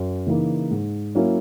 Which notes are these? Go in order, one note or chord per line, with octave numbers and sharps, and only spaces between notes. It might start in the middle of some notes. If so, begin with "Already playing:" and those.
Already playing: F#2
C#3 E3 A#3 D#4
G#2
F#3 A#3 C#4 E4